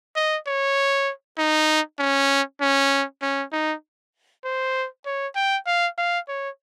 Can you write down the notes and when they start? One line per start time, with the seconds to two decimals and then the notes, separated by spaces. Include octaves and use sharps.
0.16 D#5
0.47 C#5
1.38 D#4
1.99 C#4
2.61 C#4
3.22 C#4
3.53 D#4
4.44 C5
5.06 C#5
5.36 G5
5.66 F5
5.98 F5
6.28 C#5